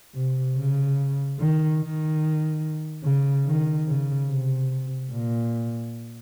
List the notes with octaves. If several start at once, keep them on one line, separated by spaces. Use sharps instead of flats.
C3
C#3
D#3
D#3
C#3
D#3
C#3
C3
A#2